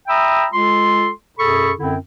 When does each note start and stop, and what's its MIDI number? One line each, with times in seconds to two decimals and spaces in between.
0.08 0.45 76
0.08 0.45 79
0.08 0.45 82
0.08 0.45 83
0.08 0.45 87
0.08 0.45 88
0.53 1.09 56
0.53 1.09 65
0.53 1.09 69
0.53 1.09 84
1.39 1.71 42
1.39 1.71 47
1.39 1.71 68
1.39 1.71 69
1.39 1.71 83
1.39 1.71 85
1.79 1.95 42
1.79 1.95 50
1.79 1.95 60
1.79 1.95 64